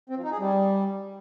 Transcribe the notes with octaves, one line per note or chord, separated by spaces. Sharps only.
C4
F3
D#4
G#4
G3